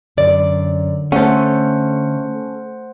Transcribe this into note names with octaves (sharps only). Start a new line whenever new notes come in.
F#2 D3 D5
A3 C#4 A4 C5 F#5